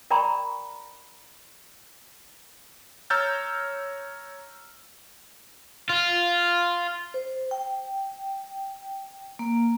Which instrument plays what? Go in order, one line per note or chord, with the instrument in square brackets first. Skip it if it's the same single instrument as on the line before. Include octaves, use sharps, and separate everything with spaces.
[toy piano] A#4 D5 G5 A#5 B5 C#6
[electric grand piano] C#5 A#5 E6 F6 G6 A6
[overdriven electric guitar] F4
[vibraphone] C5
G5
A#3